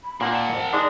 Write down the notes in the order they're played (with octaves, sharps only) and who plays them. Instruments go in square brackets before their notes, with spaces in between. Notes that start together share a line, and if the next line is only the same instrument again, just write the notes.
[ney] B5
[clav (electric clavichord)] A#2 A#3 D#4 [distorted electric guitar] D4 [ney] F#5
[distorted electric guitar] A#4 A5
[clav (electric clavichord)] F2
[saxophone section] G#3 D4 D#4 [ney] D5